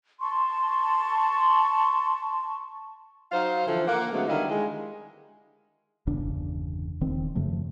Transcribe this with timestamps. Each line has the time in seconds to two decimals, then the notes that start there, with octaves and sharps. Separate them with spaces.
0.21 A5 C6 C#6
3.32 F#3 D#4 C5 F5
3.66 D3 E3 F3 E4 A4
3.87 A#3 F#5
4.12 D3 F#3 G#3 A3 B3 C4
4.28 D3 D#3 G3 D#4 E4 F5
4.49 G#3 D#4
6.07 G1 E2 C#3 D4
7.01 D#1 D#3 C4
7.35 F#2 C#3 F3 A3